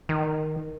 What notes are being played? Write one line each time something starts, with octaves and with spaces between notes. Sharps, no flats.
D#3